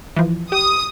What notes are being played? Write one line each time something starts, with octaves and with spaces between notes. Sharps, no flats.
E3 F3
G4 D#6